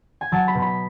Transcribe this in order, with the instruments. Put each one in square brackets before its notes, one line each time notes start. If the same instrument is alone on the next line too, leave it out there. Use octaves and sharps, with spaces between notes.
[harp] G#5
F#3 A5
B5
B2
B5